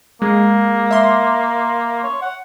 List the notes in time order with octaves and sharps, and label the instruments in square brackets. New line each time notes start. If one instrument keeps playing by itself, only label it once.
[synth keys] G#3 [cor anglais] A#3
[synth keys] E5 C6
[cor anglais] C#5
F#5